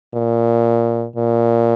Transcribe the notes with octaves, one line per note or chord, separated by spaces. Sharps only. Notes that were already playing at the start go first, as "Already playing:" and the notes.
A#2
A#2